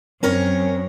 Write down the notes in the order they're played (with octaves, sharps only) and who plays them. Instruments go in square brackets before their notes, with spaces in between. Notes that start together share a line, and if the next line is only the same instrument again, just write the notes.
[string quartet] F#2 [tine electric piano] C4 [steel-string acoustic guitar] C#4 A#4 C#5